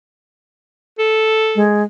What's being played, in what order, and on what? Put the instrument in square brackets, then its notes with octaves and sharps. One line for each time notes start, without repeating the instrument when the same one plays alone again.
[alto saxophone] A4
[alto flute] G#3